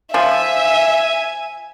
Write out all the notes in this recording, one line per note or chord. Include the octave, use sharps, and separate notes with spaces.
F3 E5 G#5